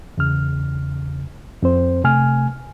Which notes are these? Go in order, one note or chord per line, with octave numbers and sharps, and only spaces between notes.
E2 C#3 F6
F2 C4 C5
C3 A3 G#5 F6